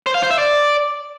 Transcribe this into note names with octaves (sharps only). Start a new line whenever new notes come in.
C5
F5
C5
E5
D5